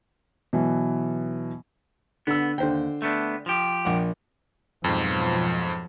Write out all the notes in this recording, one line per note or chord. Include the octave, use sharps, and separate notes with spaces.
B2 E3 F#3
D3 B3 E6
D#2 D3 C5 G5
A3 B3 D4
F3 G4
A#1 F#5
F2 G#2 B2 F3 F#3